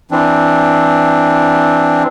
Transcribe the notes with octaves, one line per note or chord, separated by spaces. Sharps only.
E3 C4 D4